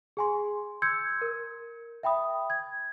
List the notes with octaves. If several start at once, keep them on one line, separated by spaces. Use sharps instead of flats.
G#4 G#5 C6
C6 E6 G6 G#6 C#7
A#4
E5 G5 B5 D#6
G#6